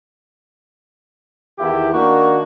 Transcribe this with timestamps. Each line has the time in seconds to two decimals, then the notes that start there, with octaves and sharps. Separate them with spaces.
1.58 E2 D#3 E4 G4
1.93 D#3 A#3 D4 F#4